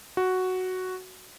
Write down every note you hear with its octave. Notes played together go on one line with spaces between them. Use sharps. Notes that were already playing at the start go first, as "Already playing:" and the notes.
F#4